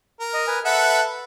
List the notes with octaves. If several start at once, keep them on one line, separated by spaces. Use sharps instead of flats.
A#4
D#5
B4 G#5
A4 B4 E5 F#5